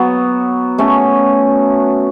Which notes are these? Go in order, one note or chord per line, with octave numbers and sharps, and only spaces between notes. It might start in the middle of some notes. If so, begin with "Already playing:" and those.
Already playing: F#3 B3
A3 C#4